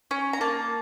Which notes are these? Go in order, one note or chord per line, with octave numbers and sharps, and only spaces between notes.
C#4
A#5
A#3 A5